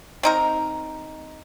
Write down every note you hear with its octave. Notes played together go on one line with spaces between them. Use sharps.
C4 D#4 A#4